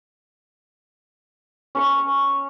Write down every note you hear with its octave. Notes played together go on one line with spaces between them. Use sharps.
C#4 C#5 C#6